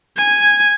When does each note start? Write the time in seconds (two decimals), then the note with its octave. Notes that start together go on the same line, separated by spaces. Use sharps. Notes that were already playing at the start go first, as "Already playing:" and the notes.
0.17 G#5